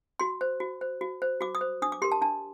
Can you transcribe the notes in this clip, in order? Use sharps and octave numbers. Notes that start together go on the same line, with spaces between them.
F#4 C6
C5
F#4
C5
F#4
C5
F#4 D6
D#6
C5
D4 D#6
D6
G4 A#4 C6
A5
D4 A5